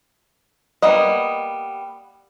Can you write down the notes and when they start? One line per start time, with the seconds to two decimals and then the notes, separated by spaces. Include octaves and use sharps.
0.82 G3 A#3 B3 D#5